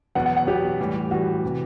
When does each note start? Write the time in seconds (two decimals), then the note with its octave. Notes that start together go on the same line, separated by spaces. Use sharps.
0.15 E2 B2 F#3 B3 F#5
0.26 F#5
0.37 F#5
0.47 E2 B2 F#3 B3 G4
0.80 A2 E3 G3
1.11 A2 E3 G3 F#4
1.45 C3 E3